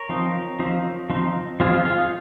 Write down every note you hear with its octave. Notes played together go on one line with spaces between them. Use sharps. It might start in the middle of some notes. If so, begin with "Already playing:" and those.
Already playing: A#4 C#5
F3 C4 D#4
F3 C4 D#4
F3 C4 D#4
F3 C4 D#4 F4 G#4
F4
F4 G#4
D#4